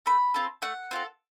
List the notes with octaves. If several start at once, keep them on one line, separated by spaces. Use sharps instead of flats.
A3 B5
C4 F4 A4
A3 F#5
C4 F4 A4